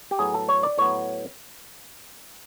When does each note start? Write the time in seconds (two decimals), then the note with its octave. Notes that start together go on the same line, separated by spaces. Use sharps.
0.11 G4
0.19 A2 F#3 B3 G#4
0.34 A4
0.49 C#5
0.63 D5
0.78 A2 F#3 B3 C#5